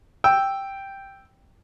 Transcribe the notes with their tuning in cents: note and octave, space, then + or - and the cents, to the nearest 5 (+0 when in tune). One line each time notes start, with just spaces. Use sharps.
G5 +0 E6 +0